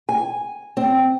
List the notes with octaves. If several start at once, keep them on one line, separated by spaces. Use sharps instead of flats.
G#5
C4